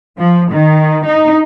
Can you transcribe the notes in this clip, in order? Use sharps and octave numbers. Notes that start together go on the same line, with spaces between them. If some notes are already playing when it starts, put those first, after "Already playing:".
F3
D#3
D#4